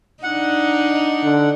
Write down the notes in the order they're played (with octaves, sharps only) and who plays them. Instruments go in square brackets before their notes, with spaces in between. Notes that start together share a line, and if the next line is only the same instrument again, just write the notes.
[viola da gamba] D4 D#4 [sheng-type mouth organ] F#5
[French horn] D3